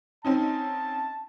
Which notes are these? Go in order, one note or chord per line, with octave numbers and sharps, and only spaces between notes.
C4 C#4 D#4 A5